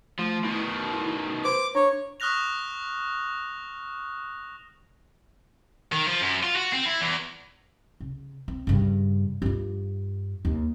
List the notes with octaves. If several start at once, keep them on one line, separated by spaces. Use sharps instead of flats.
F3 A3
B2 D#3 E4
E4
B4 C5 C6 D6
D4 C#5
C#6 D#6 F6 F#6 A#6 F7
D#3
F3
F#2
F4
F#4
C4
E4
E2
C#3
C4
G2 C#3
G2 F4
D#2